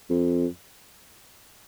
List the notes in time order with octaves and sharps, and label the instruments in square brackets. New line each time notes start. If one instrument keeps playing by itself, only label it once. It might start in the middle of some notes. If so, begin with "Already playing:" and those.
[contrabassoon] F2